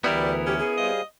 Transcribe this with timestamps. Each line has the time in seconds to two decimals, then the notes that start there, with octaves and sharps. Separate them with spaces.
0.04 D2 E3 G3 B3 E4 A#4 D5
0.46 C#4 G4
0.59 G#4
0.77 G3 C5 D#5 F5